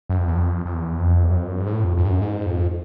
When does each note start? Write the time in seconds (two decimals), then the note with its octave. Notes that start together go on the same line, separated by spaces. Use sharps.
0.09 F#2
0.18 F2
0.27 E2
0.36 F2
0.66 F2
0.74 E2
0.99 F2
1.23 E2
1.31 F#2
1.36 F2
1.48 F#2
1.60 G2
1.66 G#2
1.73 A2
1.84 F2
1.97 F2
2.05 G2
2.09 F#2
2.21 G#2
2.46 F2